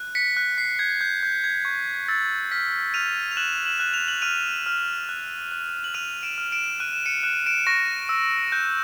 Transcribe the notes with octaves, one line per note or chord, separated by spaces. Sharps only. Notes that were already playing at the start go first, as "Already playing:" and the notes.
Already playing: F#6
B6 C#7
F#6
C7
G6 G#6
G6
G6
G#6
C#6 G#6
E6 A6
F6 B6
F6 D#7 F7
F7
F#6 E7 F#7
E7 F#7
F#6
F7
F#7
F6 D#7 F7
F6
F#6
F#6
F#7
F6 D#7 F7
D7 E7
F6
D7 E7
F#6 D#7
E7
C#7 D#7
F#6 E7
D#7
D7 E7
C#6 A#6
E6
F#6 G6